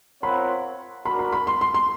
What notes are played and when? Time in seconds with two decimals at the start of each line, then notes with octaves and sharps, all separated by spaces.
0.22 C4 F4 A#4 C#5 F#5 B5
1.05 D4 F#4 A#4 B5
1.19 B5
1.32 B5
1.47 C6
1.61 C6
1.74 C6